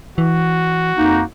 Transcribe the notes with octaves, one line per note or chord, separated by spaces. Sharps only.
E3 F#4
F2 A#3 D#4